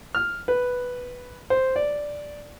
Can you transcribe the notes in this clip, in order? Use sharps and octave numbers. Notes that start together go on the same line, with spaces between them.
F6
B4
C5
D5